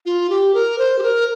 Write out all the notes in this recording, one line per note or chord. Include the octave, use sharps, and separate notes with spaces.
F4
G4
A#4
C5
G4
A#4